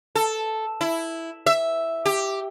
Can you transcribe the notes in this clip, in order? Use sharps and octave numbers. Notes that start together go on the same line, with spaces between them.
A4
E4
E5
G4